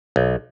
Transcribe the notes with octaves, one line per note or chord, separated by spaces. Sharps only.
B1